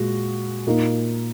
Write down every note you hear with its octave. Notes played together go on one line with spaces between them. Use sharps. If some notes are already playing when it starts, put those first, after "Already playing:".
Already playing: A#2 G#3 F#4
A#2 A#3 D#4